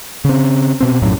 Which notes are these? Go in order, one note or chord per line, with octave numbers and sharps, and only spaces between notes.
C#3 C4
B2 C4
A#1 F#2 A2 F#3